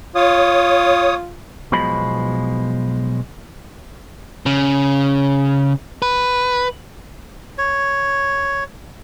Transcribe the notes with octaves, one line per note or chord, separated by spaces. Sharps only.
F4 C#5 D#6
B1 B2 F3 G#3 B5
C#3
B4
C#5